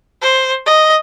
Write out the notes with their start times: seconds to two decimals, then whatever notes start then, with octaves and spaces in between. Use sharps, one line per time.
0.22 C5
0.66 D#5